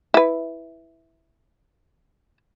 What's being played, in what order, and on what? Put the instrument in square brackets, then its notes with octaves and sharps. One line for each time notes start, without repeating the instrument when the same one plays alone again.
[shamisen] E4 B4